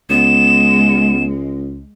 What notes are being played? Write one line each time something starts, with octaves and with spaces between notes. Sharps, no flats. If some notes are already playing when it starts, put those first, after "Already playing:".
C#2 G#3 B3 E7